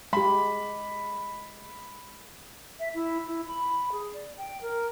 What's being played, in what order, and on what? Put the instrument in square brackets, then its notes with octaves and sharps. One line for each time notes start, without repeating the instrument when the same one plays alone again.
[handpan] G#3 G4 [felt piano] B5
[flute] E5
E4
E4
B5
G#4
D5
G5
A#4